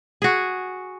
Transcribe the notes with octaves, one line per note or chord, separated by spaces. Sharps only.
F#4 G#4